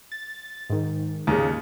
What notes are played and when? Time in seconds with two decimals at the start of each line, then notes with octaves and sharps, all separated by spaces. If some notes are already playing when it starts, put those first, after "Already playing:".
0.12 A6
0.70 G#2 D#3
1.27 D#2 A#2 C#3